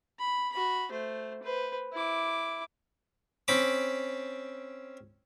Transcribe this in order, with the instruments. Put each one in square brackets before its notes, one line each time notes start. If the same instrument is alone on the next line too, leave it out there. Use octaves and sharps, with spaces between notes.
[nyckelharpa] B5
F#4 B5
A3 C5
B4 C5
E4 D6
[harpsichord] C4 C#4 B5 D6